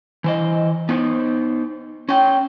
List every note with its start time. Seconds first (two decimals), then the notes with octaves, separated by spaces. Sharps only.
0.24 E3 C5 D#5
0.89 B3 D#4 C5
2.09 C#4 G5